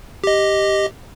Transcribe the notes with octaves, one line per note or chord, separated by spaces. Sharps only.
G4 D#5